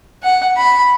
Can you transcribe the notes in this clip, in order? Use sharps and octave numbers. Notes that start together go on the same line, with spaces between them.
F#5
B5